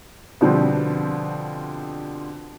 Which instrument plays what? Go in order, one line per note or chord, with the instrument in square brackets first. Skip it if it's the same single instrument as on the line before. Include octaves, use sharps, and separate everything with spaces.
[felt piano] B2 D3 F3 G3 C4